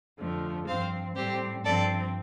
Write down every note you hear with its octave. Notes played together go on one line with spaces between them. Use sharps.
F2 D3 F3 A3
G2 F3 C4 C5 F5
A2 G3 C4 G4 C5
G2 F3 C4 A4 D5